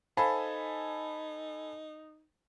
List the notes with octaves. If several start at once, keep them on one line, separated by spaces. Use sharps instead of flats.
D#4 A4 C5 F5 G#5 A5 B5